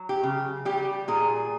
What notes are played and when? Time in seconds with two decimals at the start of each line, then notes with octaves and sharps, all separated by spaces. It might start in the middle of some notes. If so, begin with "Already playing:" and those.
Already playing: F#3
0.09 G4
0.23 C#3
0.65 G3 G4
1.08 A#2 G#4